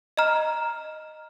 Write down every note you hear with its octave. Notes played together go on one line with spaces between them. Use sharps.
D#5 A#5 F6